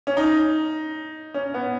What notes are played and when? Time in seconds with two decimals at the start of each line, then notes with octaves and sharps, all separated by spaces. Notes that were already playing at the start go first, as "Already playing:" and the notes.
0.07 C#4
0.17 D#4
1.34 C#4
1.54 B3